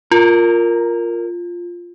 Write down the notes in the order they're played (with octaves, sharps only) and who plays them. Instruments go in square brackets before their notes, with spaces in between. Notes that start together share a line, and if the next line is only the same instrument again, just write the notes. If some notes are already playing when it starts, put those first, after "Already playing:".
[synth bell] F4 [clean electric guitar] A#4